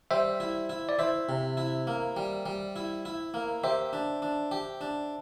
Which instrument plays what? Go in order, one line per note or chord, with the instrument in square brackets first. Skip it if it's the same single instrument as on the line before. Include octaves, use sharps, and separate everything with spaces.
[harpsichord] G3 [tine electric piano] C5 E5
[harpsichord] E4
E4
[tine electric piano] D5
[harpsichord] E4 [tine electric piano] C5 E5
[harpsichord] C3
E4
A#3
G3
G3
E4
E4
A#3
[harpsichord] G4 [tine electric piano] C5 E5
[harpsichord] D4
D4
G4
D4